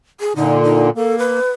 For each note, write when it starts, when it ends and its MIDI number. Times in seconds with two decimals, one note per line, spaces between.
0.20 0.33 68
0.36 0.90 46
0.36 0.90 50
0.36 0.61 63
0.63 0.89 63
0.96 1.39 58
0.96 1.18 69
1.19 1.51 71